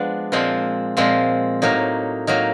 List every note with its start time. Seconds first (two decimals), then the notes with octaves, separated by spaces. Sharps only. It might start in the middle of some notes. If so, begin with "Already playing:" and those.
Already playing: F3 G#3 B3 D4
0.32 A#2 F3 G#3 C4
0.97 A#2 F3 G#3 C4
1.62 A2 F#3 A#3 D#4
2.27 A2 F#3 A#3 D#4